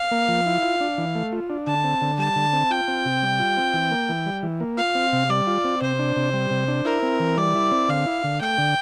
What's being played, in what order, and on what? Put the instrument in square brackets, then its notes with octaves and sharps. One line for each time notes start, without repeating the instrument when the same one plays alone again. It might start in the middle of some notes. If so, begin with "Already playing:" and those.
Already playing: [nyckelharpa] F5
[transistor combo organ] A#3
F3
E4
F4
D4
E3
A3
F4
D4
[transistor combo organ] D3 [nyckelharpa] A5
[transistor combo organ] C4
D3
[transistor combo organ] G3 [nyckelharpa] A5
[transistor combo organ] D3
C4
[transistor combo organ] F4 [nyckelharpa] G5
[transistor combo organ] C4
C3
G3
F4
C4
E3
A#3
E3
G3
E3
A#3
[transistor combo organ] F4 [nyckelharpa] F5
[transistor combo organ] C4
C3
[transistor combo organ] G3 [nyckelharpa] D5
[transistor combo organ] F4
C4
[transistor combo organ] C3 [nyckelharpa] C5
[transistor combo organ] D4
C3
G3
C3
D4
[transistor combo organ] E4 [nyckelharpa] A#4
[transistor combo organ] C4
E3
[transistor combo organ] G3 [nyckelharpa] D5
[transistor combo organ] E4
C4
[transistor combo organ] D3 [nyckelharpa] F5
[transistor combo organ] E4
D3
[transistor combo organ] A3 [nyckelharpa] G5
[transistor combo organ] D3